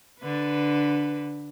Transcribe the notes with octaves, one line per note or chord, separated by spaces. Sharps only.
D3 B4